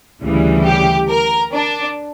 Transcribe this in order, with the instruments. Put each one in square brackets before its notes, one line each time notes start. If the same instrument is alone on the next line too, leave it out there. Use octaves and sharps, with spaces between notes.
[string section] D2 C#3 E3 G3
G4
A#4
D4